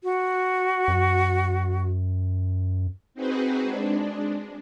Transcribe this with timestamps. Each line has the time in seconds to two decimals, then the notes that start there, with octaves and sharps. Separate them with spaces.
0.04 F#4
0.88 F#2
3.14 C4 D#4 F#4 G#4 B4 C5
3.61 G#3 D4